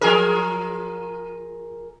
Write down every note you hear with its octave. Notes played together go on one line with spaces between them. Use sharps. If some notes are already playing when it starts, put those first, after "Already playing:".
F3 G#4 A#4